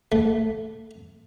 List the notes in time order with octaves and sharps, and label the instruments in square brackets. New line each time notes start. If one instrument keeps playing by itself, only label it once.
[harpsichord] A3